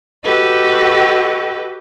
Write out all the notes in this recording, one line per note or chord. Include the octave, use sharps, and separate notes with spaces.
F#4 G4 A4 B4 D#5